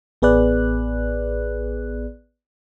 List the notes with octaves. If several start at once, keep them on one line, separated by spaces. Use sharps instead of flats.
A1 B3 G#4 B4 D5 F#6